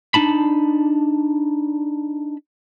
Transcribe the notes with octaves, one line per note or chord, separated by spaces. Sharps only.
D4 D#4 A5 B5